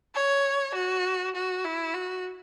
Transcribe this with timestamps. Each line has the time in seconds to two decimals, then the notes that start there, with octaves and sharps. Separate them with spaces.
0.15 C#5
0.75 F#4
1.35 F#4
1.65 E4
1.94 F#4